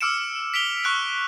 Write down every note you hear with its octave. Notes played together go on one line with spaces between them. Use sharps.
D6 E6 F6 C#7 D7 E7
B6 D7 F7 G7
C#6 F#6 D7 F7